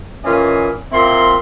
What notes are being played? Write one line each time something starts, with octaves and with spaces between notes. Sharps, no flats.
A#2 E3 C#4 D#5 F5 G#5
A#2 A#3 C4 E4 C6